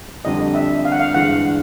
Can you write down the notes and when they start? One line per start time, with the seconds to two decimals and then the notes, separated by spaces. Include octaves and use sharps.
0.25 F2 D3 G3 D#5
0.55 E5
0.85 F5
0.92 F#5
1.00 F5
1.14 G2 E3 G#3 F#5